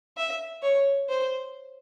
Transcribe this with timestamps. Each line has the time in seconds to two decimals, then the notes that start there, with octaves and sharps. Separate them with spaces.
0.17 E5
0.62 C#5
1.09 C5